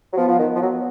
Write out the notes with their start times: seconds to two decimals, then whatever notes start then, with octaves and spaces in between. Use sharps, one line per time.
0.13 F#3
0.17 F3 B3
0.28 F3
0.39 D#3
0.55 F3
0.62 F#3